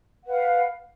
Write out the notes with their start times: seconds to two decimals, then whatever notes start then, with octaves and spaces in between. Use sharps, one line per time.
0.24 F#5
0.27 B4
0.30 F5